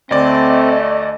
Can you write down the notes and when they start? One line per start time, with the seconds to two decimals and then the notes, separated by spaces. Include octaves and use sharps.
0.11 D2 A3 C4 D5 D#5